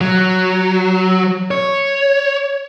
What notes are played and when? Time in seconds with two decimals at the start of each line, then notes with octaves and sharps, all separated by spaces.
0.01 F#3
1.51 C#5